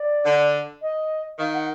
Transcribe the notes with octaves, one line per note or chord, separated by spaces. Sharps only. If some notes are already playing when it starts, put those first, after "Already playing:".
Already playing: D5
D3
D#5
D#3 F5
F#5